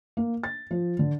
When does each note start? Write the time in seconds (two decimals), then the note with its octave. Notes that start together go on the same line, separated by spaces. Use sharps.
0.17 A#3
0.44 A6
0.71 F3
0.99 D3